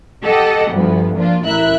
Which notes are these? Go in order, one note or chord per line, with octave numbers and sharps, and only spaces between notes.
G4 A4 D#5 F#5
D2 G2 F3 B3
F3 A#3 D4 F4
A1 E4 A#4 E5 F#6